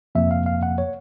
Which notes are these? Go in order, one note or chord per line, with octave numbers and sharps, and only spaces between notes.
F2 C3 F3 A#3 E5
F5
F5
F#5
C#5